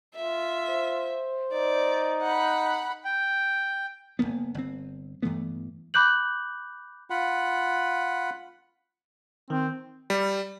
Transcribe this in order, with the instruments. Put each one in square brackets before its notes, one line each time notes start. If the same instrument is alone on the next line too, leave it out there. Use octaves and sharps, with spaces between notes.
[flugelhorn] F4 [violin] E5
[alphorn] C5
[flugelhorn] D#4 [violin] D5
[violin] F#5 B5
[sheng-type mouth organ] G5
[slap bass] F#1 G#2 A#3 B3
G1 C4
G2 E3 A3 B3
[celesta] B5 D6 F#6 G6 F#7
[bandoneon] F4 F#5 B5
[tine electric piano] D#3 [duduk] C4
[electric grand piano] G3